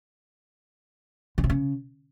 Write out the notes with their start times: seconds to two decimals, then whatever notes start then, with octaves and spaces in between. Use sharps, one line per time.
1.38 D3
1.44 C3
1.50 C#3